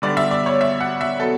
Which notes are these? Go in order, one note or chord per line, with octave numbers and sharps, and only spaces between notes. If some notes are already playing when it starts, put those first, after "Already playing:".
D3 G3 B3 D4 D5
E5
D5
C#5
E5
F#5
E5
B2 F#3 B3 A4